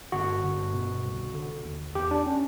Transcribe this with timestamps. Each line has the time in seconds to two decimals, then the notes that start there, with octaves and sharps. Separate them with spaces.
0.12 G1 F#4
0.42 G1
0.74 B2
1.04 C2
1.34 D3
1.65 D#2
1.95 E2 G4
2.11 D4
2.26 C#4